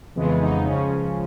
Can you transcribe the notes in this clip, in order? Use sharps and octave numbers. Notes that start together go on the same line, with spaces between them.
F2 C#3 E3 G#3 B3
D#4
C#2 C#3 F3 C#4